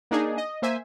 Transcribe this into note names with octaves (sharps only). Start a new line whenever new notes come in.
A#3 D4 D#4 G#4
D#5
A#3 C5 E5 G#5